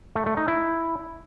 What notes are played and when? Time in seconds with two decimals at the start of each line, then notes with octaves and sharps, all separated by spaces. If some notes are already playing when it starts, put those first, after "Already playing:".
0.15 A3
0.26 A3
0.37 D#4
0.48 E4